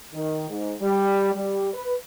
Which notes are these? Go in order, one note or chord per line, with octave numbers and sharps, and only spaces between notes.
D#3
G#2
G3
G3
B4